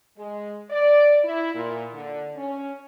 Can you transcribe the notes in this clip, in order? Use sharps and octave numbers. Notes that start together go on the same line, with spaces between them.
G#3
D5
E4
A#2
D3
C#4